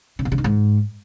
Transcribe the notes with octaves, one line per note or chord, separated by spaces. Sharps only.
C#3
B2
C#3
D#3
G#2